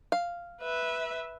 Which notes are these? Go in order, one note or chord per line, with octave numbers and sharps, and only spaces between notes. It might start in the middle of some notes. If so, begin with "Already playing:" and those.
F5
B4 E5